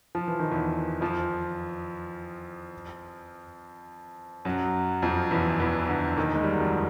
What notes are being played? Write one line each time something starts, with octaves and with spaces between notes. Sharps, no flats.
F3
E3
D#3
E2 E3
F2 F3
F#2 F#3
F2 F3
E2 E3
E2 E3
D3
D#2 D#3
G#3
G3
F#3
F2 F3